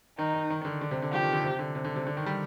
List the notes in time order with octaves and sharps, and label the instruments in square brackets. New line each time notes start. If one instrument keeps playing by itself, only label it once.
[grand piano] D#3 [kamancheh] D#4
[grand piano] D#3
D#3
D#3
D3
D3
C3
D3
[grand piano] F3 [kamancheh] G4
[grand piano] D#3
D3
C3
D3
C3
D3
C3
D3
D#3
G3